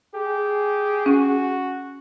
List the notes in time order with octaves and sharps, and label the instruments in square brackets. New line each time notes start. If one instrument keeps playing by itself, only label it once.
[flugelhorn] G4 [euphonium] G#4
[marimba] C#4 [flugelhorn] F#4